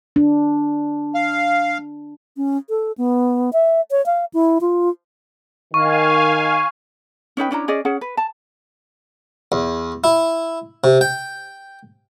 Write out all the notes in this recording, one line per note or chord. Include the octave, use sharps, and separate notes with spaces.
D4
F5
C#4
A4
B3
E5
C#5
F5
E4
F4
D#3 F5 G#5 C#6
C#4 D#4 B4 G5
C#4 D4 E4 A#5
C#4 G#4 D5 D#5
C#4 G#4 F#5
B4
A5
E2
E4
C3
G5